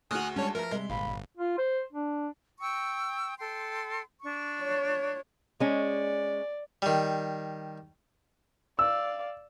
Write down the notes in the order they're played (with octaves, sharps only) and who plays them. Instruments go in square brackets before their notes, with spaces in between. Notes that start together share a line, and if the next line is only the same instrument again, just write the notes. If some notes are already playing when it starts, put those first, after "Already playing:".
[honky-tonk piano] D2 F#4 [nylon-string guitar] G#4 [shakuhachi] G#5 [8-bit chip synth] D#6 F6 F#6
[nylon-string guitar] G3 G#3 D4 [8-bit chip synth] C#4 C#5 [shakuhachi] A5
[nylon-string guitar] F3 B4 [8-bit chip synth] A#4 [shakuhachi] E5
[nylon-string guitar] C3 G3 [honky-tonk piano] G#3
[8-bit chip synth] G1 [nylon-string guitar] A#2 F5 [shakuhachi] B5
[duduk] F4
C5
D4
[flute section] G5 C#6 E6
A4 G5 C6
D4 C#6
[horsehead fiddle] C#5
[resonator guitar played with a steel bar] G#3 C#4 [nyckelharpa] D5
[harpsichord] D#3 G3
[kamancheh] D5 F5 [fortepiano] E6